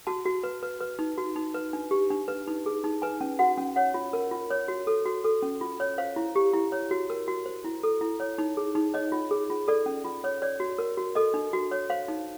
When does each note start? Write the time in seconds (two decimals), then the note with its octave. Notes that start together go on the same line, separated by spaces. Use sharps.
0.07 F#4 A5
0.25 F#4
0.44 B4
0.63 B4
0.81 B4
0.99 D#4
1.18 F#4
1.36 D#4
1.54 B4
1.73 D4
1.91 G4
2.10 D4
2.28 B4
2.48 D#4
2.66 G#4
2.84 D#4
3.02 B4 G#5
3.21 C#4
3.39 F#4 F#5
3.58 C#4
3.76 C#5 F#5
3.94 F4
4.13 A#4
4.31 F4
4.50 C#5
4.68 F#4
4.87 A4
5.05 F#4
5.24 A4
5.42 C#4
5.61 F4
5.80 C#5
5.98 C5 F5
6.16 E4
6.36 G4
6.53 E4
6.72 C#5
6.91 F#4
7.10 A#4
7.28 F#4
7.46 C5
7.65 E4
7.83 A4
8.01 E4
8.20 C#5
8.38 D#4
8.57 G#4
8.75 D#4
8.94 C#5 D#5
9.12 F4
9.31 G#4
9.50 F4
9.68 A4 D5
9.86 C#4
10.05 F4
10.24 C#5
10.42 C#5 D5
10.60 F#4
10.78 A#4
10.97 F#4
11.15 A4 D#5
11.34 D4
11.53 F#4
11.71 C#5
11.90 C5 F5
12.08 D#4